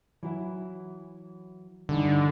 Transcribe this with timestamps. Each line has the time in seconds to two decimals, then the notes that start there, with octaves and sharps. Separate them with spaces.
0.23 E3 F#3 E4
1.89 G2 D3 E3 D#4